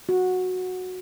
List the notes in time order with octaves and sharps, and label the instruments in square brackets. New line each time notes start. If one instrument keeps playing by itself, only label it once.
[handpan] F#4